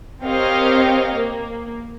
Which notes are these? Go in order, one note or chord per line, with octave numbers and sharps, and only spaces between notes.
C4 G4 A#4 C#5 D#5 F5
A#3